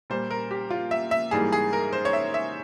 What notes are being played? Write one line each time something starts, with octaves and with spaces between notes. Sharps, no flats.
A#2 G3 A#3 C5
A#4
G4
F4
E5
E5
G#2 E3 G3 A#3 G#4
G#4
A#4
C5
C#5
E5
E5